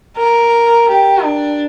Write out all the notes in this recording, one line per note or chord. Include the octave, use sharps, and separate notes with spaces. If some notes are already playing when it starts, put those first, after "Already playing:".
A#4
G4
D4